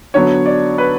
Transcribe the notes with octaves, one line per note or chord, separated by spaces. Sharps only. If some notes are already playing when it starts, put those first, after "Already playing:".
D3 F#3 B3 C#5
D5
B4